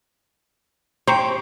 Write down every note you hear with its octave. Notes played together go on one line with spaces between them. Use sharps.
G4 C5 A#5 C#6